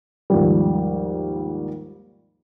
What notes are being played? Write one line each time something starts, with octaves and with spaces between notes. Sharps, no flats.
D#2 G#2 F3 G3